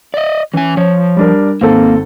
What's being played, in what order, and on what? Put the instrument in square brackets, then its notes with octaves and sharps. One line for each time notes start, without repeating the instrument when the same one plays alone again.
[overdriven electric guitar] D5 D#5
[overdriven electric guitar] E3 G#5 [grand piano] C#4
[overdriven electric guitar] F3 [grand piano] C#5
[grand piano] G3 D4 A#4
[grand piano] G#1 C4 A4 [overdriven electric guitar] A#3